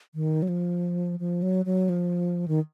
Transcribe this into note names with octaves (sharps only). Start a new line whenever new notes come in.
D#3
F#3
F3
F3
F#3
F#3
F3
D#3